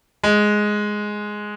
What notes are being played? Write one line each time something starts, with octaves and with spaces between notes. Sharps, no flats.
G#3